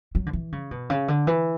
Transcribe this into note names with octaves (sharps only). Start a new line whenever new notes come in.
F#3
D3
E3
C#3
B2
C#3
D3
E3